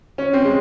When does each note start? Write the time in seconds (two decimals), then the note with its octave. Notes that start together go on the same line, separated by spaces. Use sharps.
0.18 C#4
0.33 C4
0.45 G#3